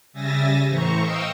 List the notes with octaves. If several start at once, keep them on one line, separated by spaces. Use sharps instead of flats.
C#3 G3 E5 G#5 A6 A#6
A2 E3 C5 A#5 C#6
D#5 F5 G5 C#6 D#6 E6